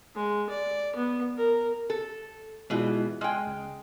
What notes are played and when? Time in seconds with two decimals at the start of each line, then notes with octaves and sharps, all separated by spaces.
0.15 G#3
0.50 D5
0.96 B3
1.37 A#4
1.90 A4
2.70 B2 E3 G#3 E4 F4
3.21 G#3 G5 G#5 F6
3.47 C#2